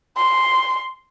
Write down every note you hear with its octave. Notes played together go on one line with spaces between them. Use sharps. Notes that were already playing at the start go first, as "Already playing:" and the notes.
C6